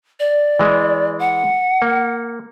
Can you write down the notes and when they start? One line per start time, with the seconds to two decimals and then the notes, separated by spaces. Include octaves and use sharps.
0.20 D5
0.59 E3 G#3
1.19 F#5
1.82 A#3